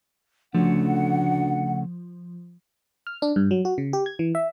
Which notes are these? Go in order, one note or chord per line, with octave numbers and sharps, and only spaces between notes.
D2 C#3 F3 A3 F#5
F6
D4
G2
F#3
F#4
C#3
G4
G#6
E3
E5